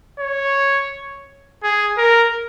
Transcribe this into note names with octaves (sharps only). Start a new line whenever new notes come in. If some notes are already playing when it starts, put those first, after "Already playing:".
C#5
G#4
A#4